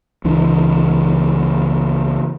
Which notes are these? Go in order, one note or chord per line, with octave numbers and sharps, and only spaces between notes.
C#2 E3 D4